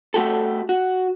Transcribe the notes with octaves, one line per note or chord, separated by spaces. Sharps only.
A3 F#4 G4 A4
F#4